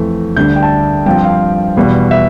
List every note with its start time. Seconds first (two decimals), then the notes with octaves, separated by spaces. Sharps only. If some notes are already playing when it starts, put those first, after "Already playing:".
Already playing: F2 E3 A3
0.36 D2 D3 G3 D4 G6
0.56 G5
0.63 A5
1.06 G2 F3 C4 G5
1.24 F5
1.77 E2 B2 G3
2.11 E5